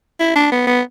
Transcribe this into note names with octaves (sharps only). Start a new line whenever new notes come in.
E4
D4
B3
B3